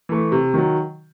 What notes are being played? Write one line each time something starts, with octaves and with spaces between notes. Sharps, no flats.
E3 A3
C3
D#3 F#3